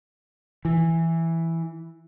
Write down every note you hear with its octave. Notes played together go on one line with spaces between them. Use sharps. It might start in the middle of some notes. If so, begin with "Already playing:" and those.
E3